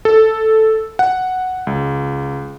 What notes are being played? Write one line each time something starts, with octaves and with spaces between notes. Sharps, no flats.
A4
F#5
C#2